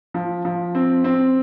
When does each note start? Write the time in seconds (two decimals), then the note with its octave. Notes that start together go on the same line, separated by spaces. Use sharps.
0.14 F3
0.45 F3
0.75 C4
1.04 C4